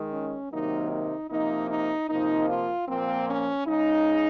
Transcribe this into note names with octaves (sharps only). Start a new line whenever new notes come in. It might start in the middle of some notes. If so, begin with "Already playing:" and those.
Already playing: D#3 G#3
C#4
C3 D#3 F#3 A#3 D#4
D#4
C3 F3 A#3 D#4
D#4
C3 F3 A#3 D#4
F4
A#2 F3 A#3 C4
C#4
C#3 G#3 D#4